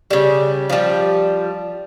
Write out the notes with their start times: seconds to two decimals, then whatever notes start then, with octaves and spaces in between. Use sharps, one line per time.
0.10 C#3 G3
0.70 F3 G3